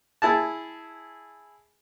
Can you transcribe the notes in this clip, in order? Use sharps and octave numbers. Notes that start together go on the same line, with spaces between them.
E4 G#4 A5